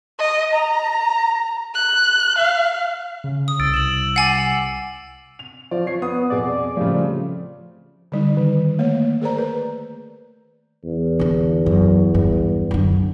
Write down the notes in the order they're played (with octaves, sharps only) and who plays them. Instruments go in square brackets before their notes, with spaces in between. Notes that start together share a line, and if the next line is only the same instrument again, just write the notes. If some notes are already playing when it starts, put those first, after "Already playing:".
[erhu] D#5
A#5
F#6
F5
[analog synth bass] C#3
[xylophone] D#6
[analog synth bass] C2 [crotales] E6 A6 D7
[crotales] E7 F#7
[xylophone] F#5 G#5 F#7 [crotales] D6 A6 C7
[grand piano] F7
[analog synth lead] F3 [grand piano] D5
[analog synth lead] C#5 [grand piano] C7
[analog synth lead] B3 [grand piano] D#6
[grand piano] F2 B2 G#4 [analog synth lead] D5
[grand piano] C#3 G3 A3 [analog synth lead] F3
[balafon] D3 G3 D#4
D#3
A3 A#3 C#5
G#4 A#4 C5 D5 A#5
B4
[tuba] E2
[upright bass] D3 D4
F#2
G2
F#2 D3